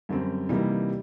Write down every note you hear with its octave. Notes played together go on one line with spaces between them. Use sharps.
F#2 D3 G3 C4
C3 E3 G3 A#3 D#4